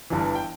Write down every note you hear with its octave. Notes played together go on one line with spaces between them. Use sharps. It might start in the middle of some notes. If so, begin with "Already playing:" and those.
G1 G2 E3
G5